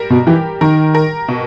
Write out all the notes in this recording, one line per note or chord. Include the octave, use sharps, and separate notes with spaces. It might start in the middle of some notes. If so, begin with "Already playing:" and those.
Already playing: G3 A#4
B2
E3 G4
D#3 A#4
A#4
B2